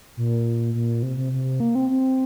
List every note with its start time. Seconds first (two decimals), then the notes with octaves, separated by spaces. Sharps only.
0.17 A#2
0.74 A#2
1.03 C3
1.17 C3
1.32 C3
1.60 A#3
1.75 C4
1.89 C4